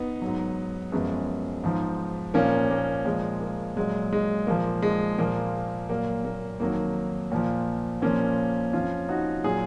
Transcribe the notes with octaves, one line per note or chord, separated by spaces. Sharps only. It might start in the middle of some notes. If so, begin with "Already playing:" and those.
Already playing: B3 D#4
G#2 F#3
F#2 F3 G#3 B3
G#2 F3
A#2 F3 A#3 C#4
A#3
A#2 F3 G#3
A#3
A#2 F#3 G#3
G#3
A#2 F3 A#3
G#3
A#2 F3 A#3
A#2 F#3 A#3
A#3
F2 D#3 F#3 A#3
A#2 F3
A#2 F3 A#3 C#4
F2 F3 C#4 F4
D#4 F#4
A#2 F#3 F4 G#4